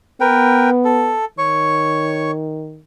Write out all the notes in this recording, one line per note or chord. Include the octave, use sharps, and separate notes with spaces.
B3 A#4 B4 G5
A4
D#3 C#5 C#6